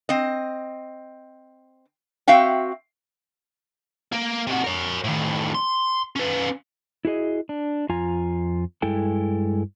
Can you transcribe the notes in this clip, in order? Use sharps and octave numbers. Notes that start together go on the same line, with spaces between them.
C4 D#5
C4 F#4 E5 F5 G5
A#3
C3 F#4
A#4 C#5
A2 D#3
C6
C#4 B4
E4 F#4 G#4 D#5
D4
F2 F4 G#5 A#5
G2 G#3 E4 A4 G5 G#5